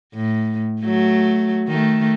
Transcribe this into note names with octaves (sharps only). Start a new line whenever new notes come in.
A2
F#3 A3
D#3 A3